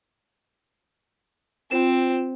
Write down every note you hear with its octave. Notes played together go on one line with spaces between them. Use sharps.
C4 F4 C5 E7